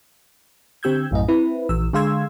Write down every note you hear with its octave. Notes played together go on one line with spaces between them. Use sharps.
D3 C4 G4 E6 G6 G#6
A#1 F#2 A2 D#5
C4 E4 B4
A#1 E3 E6
D3 G#3 F5 C6 E6 G#6